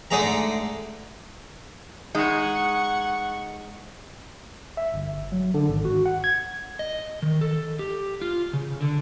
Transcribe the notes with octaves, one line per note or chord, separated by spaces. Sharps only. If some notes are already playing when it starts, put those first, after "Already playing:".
G#2 D3 A3 G#4 A#5
G#3 D#4 F#5 C#6
E5
G1
F#3
D3
G#1
F#4
F#5
G#6
D#5
D#3
A4
G4
F4
C#3
D3